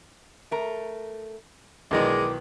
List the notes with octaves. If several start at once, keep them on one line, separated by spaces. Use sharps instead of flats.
A3 A#4
B1 D#3 E3 G#3 D4 A#4 D5